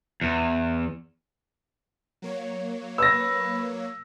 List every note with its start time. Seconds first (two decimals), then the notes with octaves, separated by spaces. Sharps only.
0.21 E2
2.22 F#3 A#3 C#5
2.98 B4 E6 A#6